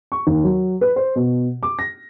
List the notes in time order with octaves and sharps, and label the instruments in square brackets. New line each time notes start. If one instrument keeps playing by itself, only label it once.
[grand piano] C#6
D#2
F#3
B4
C5
B2
D6
A#6